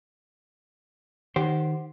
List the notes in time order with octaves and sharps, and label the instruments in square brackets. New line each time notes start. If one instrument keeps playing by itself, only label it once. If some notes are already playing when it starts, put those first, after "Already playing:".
[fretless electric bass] D#3 [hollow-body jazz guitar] G4 C5 [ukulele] F#5